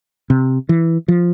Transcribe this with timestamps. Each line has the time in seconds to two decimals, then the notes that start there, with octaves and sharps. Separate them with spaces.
0.30 C3
0.69 E3
1.08 F3